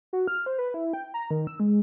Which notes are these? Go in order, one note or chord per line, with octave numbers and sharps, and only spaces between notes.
F#4
F6
C5
B4
E4
G5
A#5
D#3
E6
G#3